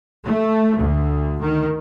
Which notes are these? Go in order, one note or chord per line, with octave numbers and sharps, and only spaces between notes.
A3
D2
D#3